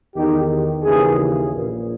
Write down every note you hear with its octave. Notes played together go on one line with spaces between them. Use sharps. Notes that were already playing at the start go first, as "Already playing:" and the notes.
E2 D#3 D#4 G4
D#2 C#3 E3 E4 G#4
A#1 A#2